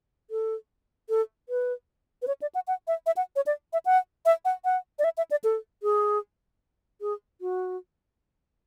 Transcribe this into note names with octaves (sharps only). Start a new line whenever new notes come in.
A4
A4
B4
B4
C#5
D5
F#5
F#5
E5
E5
F#5
C#5
D5
E5
F#5
E5
F#5
F#5
D5
E5
E5
D5
A4
G#4
G#4
F#4